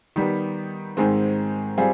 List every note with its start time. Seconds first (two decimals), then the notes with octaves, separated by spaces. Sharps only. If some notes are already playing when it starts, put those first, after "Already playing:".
0.16 D#3 G3 B3
0.97 G#2 D#3 G#3 C4
1.78 G3 C4 F4 G#4